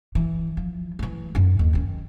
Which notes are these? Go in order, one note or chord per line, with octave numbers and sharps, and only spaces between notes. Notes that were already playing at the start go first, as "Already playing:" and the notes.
E3
F3
E3 A3
F#2 D#4
D#2
D#3 C#4